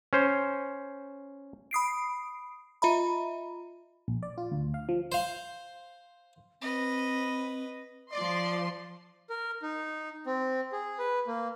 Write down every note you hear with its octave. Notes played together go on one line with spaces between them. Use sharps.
C#4 C5
B5 D#6 C7 D7
F4 D#5 E5 A#5 B5
A#1
D5
F4
D2
F5
F3
C5 F5
C4 B4 D#5
F3 D5 C6
A#4
D#4
C4
G#4
B4
A#3